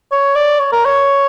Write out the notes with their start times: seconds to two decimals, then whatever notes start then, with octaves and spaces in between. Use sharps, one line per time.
0.12 C#5
0.36 D5
0.60 C#5
0.72 A#4
0.85 C#5